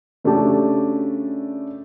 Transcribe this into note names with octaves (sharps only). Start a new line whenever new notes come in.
C#3 A3 D4 F#4 G4 A5